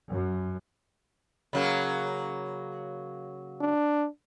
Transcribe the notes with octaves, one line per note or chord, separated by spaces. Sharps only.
F#2
C#3 F#3 A#3
D4